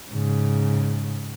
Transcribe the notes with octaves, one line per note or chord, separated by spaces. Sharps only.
G#2 C#3